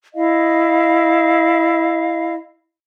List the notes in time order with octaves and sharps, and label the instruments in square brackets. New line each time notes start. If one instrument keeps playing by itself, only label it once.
[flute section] E4 D#5 F5